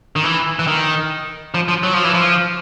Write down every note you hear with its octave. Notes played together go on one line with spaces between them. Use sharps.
D#3
E3
E3
D#3
F3
F3
F#3
F3
E3
F3